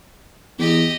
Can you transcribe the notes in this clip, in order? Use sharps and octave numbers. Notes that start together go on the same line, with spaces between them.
E2 G4 D#5